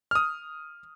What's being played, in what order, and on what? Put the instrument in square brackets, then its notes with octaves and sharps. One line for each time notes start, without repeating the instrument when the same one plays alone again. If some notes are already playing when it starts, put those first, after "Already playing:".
[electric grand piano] D#6 F6